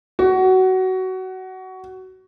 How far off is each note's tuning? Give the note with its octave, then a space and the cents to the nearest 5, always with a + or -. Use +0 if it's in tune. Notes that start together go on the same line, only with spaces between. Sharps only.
F#4 +20